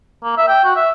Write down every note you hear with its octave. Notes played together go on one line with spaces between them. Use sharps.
A#3
E5
G5
F#4
E5